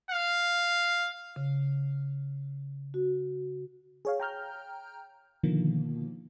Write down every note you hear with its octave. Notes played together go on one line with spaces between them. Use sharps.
F5
C#3
F#4
G#4 C#5 F5
G5 A#5 F6 G6
B2 D3 D#3 F3 A#3